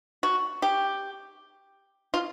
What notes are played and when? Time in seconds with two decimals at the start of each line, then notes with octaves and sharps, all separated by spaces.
0.23 F#4
0.62 G4
2.14 F4